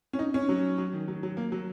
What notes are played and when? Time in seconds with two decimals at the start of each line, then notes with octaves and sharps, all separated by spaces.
0.13 C#4
0.19 D#4
0.34 C#4
0.49 F#3
0.78 F#3
0.93 D#3
1.08 F#3
1.23 F#3
1.37 A#3
1.52 F#3